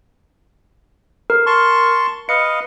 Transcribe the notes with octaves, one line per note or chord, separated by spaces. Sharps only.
A#4
A5 C6 C#6
B4 D#5 F5 C#7